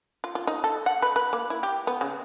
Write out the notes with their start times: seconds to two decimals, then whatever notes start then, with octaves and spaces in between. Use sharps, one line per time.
0.24 F4
0.35 F4
0.47 D#4
0.64 A4
0.86 F#5
1.02 B4
1.16 B4
1.33 A#3
1.50 E4
1.63 G4
1.87 B3
2.01 C#3